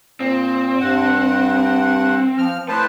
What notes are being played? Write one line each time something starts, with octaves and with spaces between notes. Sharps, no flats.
A#2 C4
G2 F#5
F3 F6
A2 B4 C5 A5